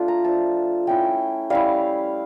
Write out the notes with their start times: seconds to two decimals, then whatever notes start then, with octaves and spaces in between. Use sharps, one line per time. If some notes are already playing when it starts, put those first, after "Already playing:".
Already playing: A3 D4 F4
0.08 A#5
0.24 F3 A3 D4 A5
0.87 A3 C#4 E4 G5
1.50 G3 C#4 E4 F5